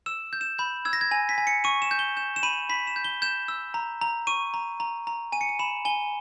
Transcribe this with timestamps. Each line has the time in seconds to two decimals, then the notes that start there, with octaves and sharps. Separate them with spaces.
0.06 E6 E7
0.33 G6
0.41 E7
0.59 B5 G6
0.85 E6 G#6
0.93 A#6
1.01 G#6
1.11 G#5 A#6
1.29 B6
1.38 G#5
1.47 C#7
1.64 C#6 D#7
1.82 E7
1.91 G6
1.99 G7
2.17 G6 E7
2.36 E7
2.43 B5 D#7
2.69 B5 B6
2.87 E7
2.96 G6
3.04 G7
3.22 G6 E7
3.48 E6
3.74 A#5
4.01 A#5
4.27 C#6 D#7
4.54 A#5
4.80 A#5
5.07 A#5
5.32 G#5 D#7
5.41 C#7
5.49 D#7
5.59 B5 E7
5.85 G#5 G7